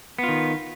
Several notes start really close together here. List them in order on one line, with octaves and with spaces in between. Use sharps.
B3 F4 D#3